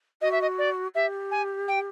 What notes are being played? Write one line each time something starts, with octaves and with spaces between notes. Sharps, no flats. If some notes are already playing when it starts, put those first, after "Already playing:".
F#4 D#5
E5
D#5
D5
G4 E5
G#5
G5